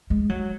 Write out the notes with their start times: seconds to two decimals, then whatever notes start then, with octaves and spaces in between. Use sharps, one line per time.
0.10 G#3
0.30 F#3